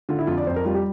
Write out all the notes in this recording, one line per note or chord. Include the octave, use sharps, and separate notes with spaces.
D3 F4
E4
F2 F4
D5
F2 C5
A#4
G3 F4
G4